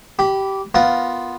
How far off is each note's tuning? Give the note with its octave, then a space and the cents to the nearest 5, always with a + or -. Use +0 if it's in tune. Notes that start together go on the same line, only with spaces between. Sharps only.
G4 -15 B5 +0
B3 +0 F4 +0 A#4 +15